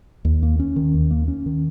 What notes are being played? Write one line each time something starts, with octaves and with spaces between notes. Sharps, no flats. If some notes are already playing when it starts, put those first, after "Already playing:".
D#2
A#3
C#4
D#3
D#2
A#3
C#4
D#3